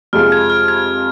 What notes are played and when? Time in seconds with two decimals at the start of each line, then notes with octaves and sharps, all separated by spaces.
0.13 F2 C3 G#3 F4 G#4 F6
0.32 G#6
0.50 F6
0.68 G#6